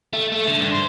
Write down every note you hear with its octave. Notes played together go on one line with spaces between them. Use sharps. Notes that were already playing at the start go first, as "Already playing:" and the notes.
A3
A3
D3
G2
C5